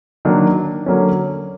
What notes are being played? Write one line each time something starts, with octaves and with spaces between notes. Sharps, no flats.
D#3 F#3 A#3 D4
D3 F#3 A#3 C#4